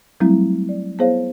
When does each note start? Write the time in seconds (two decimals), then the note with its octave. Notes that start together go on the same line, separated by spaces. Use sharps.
0.20 F#3 G3 A3 C4 E4
0.69 D5
0.99 B3 E4 G#4 C5 C#5 F5